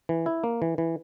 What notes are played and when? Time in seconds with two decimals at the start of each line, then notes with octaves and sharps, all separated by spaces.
0.09 E3
0.26 E4
0.44 A#3
0.62 E3
0.78 E3